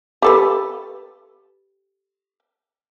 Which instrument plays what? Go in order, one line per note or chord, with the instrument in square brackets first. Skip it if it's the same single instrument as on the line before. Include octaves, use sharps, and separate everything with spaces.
[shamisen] G4 A4 B4